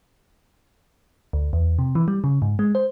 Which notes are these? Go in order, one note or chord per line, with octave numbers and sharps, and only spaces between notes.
D2
E2
C3
E3
G3
C#3
G#2
G#3
C5